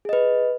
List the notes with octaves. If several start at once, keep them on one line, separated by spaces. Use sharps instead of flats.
G#4 B4 D#5